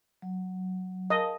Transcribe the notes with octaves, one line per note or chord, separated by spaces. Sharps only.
F#3
A#4 D#5 F5 A5